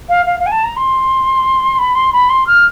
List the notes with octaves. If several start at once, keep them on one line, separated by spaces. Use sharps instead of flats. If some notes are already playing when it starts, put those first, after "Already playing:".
F5
F5
F5
G#5
A5
A#5
C6
B5
C6
B5
C6
F6